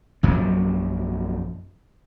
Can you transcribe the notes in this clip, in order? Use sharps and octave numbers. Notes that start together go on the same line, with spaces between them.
A#1 F#2 F3 F#3